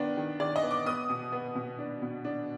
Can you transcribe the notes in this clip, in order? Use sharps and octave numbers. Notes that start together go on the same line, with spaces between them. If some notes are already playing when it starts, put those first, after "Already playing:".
Already playing: D#3 B3 D4
D#3
D#3 D5
D#5
B3
D6
B3 D#6
B2
B3
B2
D4
B2
D4